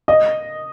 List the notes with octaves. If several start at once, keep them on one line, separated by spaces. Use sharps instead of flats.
D#5